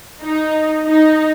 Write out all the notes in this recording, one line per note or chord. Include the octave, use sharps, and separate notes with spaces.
D#4
D#4